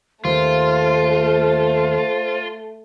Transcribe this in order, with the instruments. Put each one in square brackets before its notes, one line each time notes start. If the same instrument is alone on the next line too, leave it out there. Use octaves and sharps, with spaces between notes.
[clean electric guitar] D#2 [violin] A3 [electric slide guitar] F4 [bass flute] C5